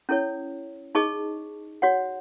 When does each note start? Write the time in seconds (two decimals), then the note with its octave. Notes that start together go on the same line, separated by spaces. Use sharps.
0.09 C#4 E4 A4 C#5
0.95 D#4 G#4 D#5 A5 C#6
1.82 F#4 C#5 F#5